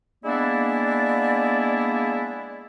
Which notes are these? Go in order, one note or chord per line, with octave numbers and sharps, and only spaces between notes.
G#3 A#3 B3 D4 E4 D5